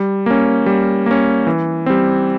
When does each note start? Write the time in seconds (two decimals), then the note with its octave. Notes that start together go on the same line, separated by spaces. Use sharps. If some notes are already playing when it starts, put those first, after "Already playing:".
Already playing: G3
0.26 A#3 C#4
0.66 G3
1.06 A#3 C#4
1.47 E3
1.86 G3 C4